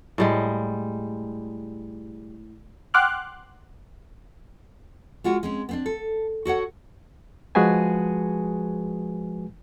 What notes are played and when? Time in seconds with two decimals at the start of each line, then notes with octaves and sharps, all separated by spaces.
0.18 A2 G3 G#3
2.94 F#5 G5 C6 D6 F6 F#6
5.24 G#3 F4 F#4
5.43 G#3 C4 C#4
5.69 B3 C4 D4
5.86 A4
6.45 F#4 A4 C#5 F#5
7.55 F3 G#3 F#4 G#4 B4 G#5